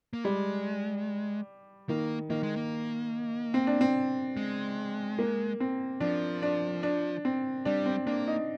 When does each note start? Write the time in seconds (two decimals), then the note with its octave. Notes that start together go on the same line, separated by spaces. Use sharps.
0.13 A#3
0.24 G3 G#3
1.89 D#3 A#3
2.30 D#3 A#3
2.43 G#3
2.56 A#3
3.54 C4
3.67 D4
3.81 C4
4.37 G#3
5.19 A#3
5.60 C4
6.00 F3 D4
6.42 D4
6.83 D4
7.25 C4
7.65 G3 D4
7.86 C4
8.07 A#3 D4
8.27 D#4